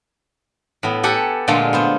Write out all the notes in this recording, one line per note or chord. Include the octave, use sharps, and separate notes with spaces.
A2 B3
G4 A4 F#5 G#5
A#2 D3 G#3 A3 F4
B3 F4 C5